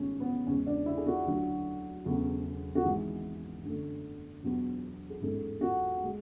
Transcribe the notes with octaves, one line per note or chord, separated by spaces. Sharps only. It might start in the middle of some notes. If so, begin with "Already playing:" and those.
Already playing: B1 A2 E3 G#3 C#4
B3
E2 C#3 G#3 C#4
D4
E4
G#4
F#4
D2 D3 F#3
E1 E2 C#3 F#3 A3
F#4
G#1 G#2 E3 G#4
F#2 D3 A3
E1 E2 B2 F#3
G#4
A1 G#2 G#3 A4
F#4
G#3